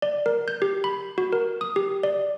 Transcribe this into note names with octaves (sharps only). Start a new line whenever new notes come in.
D5
A#4
G6
G4
B5
F#4
A#4
D#6
G4
D5